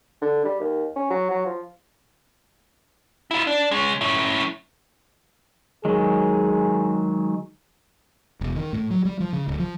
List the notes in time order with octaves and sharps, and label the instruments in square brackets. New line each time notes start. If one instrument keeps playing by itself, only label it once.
[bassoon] D3
G3
D#2
C#4
F#3
F#3
F3
[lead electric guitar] E4 F4
D4
G#3 C#4
C#4 E4
[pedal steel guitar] D#3 F#3 G#3 [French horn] G#4
[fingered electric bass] E1
D#3
A2
F#3
G3
F3
C#3
D1
F3